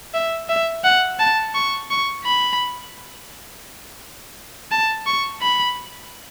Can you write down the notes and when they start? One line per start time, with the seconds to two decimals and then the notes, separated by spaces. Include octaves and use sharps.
0.14 E5
0.49 E5
0.84 F#5
1.19 A5
1.54 C#6
1.90 C#6
2.24 B5
4.72 A5
5.06 C#6
5.42 B5